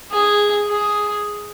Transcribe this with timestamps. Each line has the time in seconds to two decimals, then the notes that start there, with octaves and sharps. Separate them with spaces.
0.12 G#4
0.69 G#4